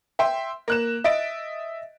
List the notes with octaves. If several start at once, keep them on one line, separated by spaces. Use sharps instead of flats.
E5 G5 C6
A#3 F#6 E7
D#5 E5 A6 D7